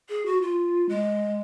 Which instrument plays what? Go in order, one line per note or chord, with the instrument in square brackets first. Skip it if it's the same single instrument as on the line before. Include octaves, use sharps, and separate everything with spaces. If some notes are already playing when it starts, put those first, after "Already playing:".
[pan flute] G#4
F#4
F4
G#3